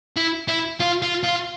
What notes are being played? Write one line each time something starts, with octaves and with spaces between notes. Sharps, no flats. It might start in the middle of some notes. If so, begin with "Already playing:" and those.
E4
E4
F4
F4
F4